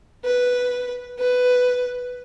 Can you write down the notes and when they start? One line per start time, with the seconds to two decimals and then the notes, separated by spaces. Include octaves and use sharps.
0.25 B4
1.19 B4